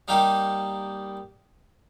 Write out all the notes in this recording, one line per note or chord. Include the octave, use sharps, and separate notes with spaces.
G3 A#3 D#4 G4